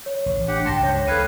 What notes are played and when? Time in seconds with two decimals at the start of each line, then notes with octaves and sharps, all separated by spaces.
0.06 C#5
0.26 A1
0.48 D4 G4 F#5
0.65 C#2 G2 G5 A5 C6 A#6 C#7
0.83 C5 C#5
1.07 D2 A4 B4 F5 G#6 D#7